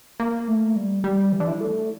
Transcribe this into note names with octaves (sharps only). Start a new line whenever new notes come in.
A#3
A3
G3
G3
E3
D3
E3
A3